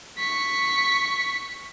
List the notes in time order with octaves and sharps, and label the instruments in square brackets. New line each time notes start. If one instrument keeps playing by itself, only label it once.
[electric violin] C#6 B6